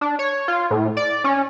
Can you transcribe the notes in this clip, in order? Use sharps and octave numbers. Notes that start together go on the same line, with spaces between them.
D4
C#5
F4
A2
D5
C#4